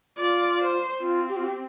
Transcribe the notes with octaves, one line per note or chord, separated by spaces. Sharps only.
F4 D5
C5
C4 F4
G4
F4
G4